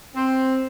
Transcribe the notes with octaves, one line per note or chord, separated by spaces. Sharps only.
C4